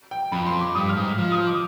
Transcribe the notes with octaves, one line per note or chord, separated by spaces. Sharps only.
G5
F2 B5
C6
D6
G2 D#6
F6
G#2
F3 F6
D#6
D6